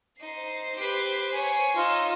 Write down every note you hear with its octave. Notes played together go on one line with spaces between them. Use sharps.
D#4 C5 C7
G4 B4
C#5 G#5
D#4 F4 E6